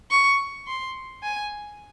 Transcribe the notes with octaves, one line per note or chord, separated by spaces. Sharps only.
C#6
C6
G#5